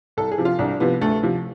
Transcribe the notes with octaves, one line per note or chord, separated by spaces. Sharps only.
C2 A4
G#4
C3 F3
F4
C2 D4
C3 F3 B3
D2 A3
C3 F3